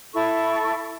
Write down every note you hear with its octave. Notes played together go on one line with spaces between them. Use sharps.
E4 A4 C#6